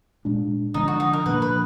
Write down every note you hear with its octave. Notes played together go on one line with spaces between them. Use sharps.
A#2 G#3 D4
D3 F3 B3 D4 D#4
F#4
D#4
A#4
A#2 F3 A#3 D4 B4
B4